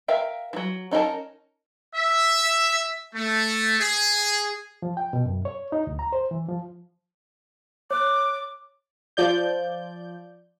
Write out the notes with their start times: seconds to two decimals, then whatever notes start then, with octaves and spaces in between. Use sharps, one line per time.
0.08 A#4 E5 F5 G5
0.53 E3 F#3
0.91 C#4 D#4 E4 A#4 A5
1.95 E5
3.14 A3
3.80 G#4
4.82 F3
4.97 G5
5.13 B2
5.26 F#2
5.45 C#5
5.72 D#4
5.87 D2
5.99 A#5
6.13 C5
6.31 E3
6.49 F3
7.91 C#5 D6 F#6
9.17 F3 D5 G6